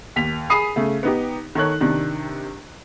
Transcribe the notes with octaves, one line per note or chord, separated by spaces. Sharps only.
D#2 B6 F7
G#4 B5 D#6 C7 D#7 F7
C#3 A3
B3 D#4 G4
D#3 A4 A#4 C#5 F#6
C3 D#3 D4